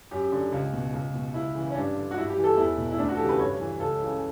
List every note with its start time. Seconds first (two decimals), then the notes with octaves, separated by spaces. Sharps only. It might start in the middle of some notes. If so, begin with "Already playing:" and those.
0.11 F#2 G4
0.32 D3
0.52 C#2
0.73 B2
0.94 C#2
1.14 B2
1.34 C#2 E4
1.55 C#3 E3
1.70 C#4
1.75 G2 D4
1.96 D3
2.11 F#4
2.16 G2 E4
2.30 G4
2.37 E3
2.44 A4
2.57 E2 E4
2.77 B2
2.91 E4
2.98 D2 D4
3.09 F#4
3.15 A4
3.18 C#3 E3 G4
3.29 B4
3.39 G2 C#5
3.60 E3
3.80 C#2 A4
4.01 C#3 E3